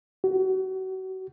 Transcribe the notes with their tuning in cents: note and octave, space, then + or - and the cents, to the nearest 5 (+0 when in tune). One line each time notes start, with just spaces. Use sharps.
F#4 +35